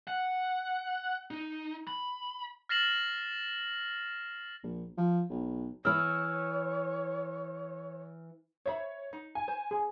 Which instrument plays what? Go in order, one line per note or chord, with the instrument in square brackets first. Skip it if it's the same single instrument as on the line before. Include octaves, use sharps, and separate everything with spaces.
[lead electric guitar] F#5
D#4
B5
[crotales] F6 A6 A#6 C7 E7 F#7
[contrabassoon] A#1
F3
B1
[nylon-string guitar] E3 E4 [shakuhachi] C#5 [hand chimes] E6 F6
[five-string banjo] C5 E5 B5 [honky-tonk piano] C#5
[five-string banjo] D#4
[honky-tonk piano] G#5
[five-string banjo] C5
[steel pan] G#4